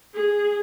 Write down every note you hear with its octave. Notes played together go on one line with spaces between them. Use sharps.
G#4